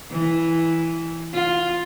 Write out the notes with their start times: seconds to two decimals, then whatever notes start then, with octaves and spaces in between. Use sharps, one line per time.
0.11 E3
1.34 F4